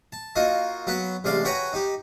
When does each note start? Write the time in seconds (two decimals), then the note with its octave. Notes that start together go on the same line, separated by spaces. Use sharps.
0.13 A5
0.36 A#3 D#4 F4 F#4 D#5
0.87 F#3 B3 F#4 B4
1.24 A1 C3 G#3 D5 F5 C6
1.45 F#4 B4 C#5 G5 G#5 A#5
1.73 D#4 G4